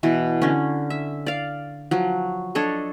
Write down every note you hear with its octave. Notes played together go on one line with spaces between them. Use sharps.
B2 E3
D3 C#4
E5
D5 F5
F3 F#3
D4 A4 C#5 D#5